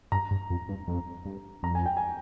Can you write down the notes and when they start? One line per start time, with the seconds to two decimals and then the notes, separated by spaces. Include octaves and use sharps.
0.12 G2 A#5
0.31 G2
0.50 F2
0.69 G2
0.88 F2
1.26 G2
1.63 F2 A#5
1.75 G#5
1.86 G5
1.97 G#5